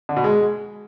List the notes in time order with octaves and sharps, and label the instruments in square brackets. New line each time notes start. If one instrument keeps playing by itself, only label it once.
[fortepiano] D3
B2
G#3